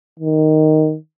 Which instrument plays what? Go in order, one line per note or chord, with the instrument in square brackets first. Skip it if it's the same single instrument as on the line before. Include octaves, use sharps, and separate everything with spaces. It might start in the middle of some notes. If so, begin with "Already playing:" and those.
[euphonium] D#3